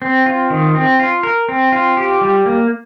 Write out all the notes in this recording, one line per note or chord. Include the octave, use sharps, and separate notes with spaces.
C4
F4
D#3
C4
F4
A#4
C4
F4
G4
G3
A#3